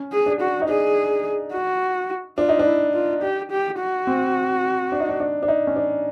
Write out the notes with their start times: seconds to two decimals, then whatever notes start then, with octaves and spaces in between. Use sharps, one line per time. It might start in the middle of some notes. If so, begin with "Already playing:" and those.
Already playing: C#4
0.12 G#4
0.26 D4
0.41 F#4
0.62 D#4
0.68 D4 G#4
1.53 F#4
2.38 D4 F4
2.49 D#4
2.59 D4
2.66 E4
2.94 F4
3.22 G4
3.51 G4
3.79 F#4
4.07 C4
4.92 D4
5.00 D#4
5.09 D4
5.20 D4
5.43 D4
5.48 D#4
5.67 C#4
5.76 D4